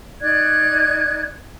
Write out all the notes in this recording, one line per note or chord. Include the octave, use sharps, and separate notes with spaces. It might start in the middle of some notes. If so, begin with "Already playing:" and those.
D#4 D5 F#6 G#6